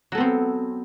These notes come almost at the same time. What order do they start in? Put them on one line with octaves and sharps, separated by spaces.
F#3 A4 B3 C4